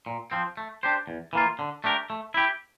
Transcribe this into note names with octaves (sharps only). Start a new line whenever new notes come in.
A#2
F3 C4
A3
D4 G4 C5
E2
E3 A#3 F4
D3
A3 D4 G4 A#4
A3
E4 G4